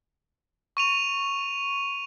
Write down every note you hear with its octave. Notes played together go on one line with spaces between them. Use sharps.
C#6 D#7 F7